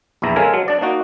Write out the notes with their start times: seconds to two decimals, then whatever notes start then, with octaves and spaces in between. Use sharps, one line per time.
0.22 A#1 E2 E4 A#5
0.36 C#3 G#3 A4 A#4 G#5
0.54 F#3
0.68 D4 D5
0.81 A#3 D#4 F#4